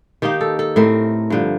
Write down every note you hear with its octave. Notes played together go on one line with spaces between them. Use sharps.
D#3 A#3 D#4 G4
A4
A4
A2 A3 C4 A#4
G2 D3 F3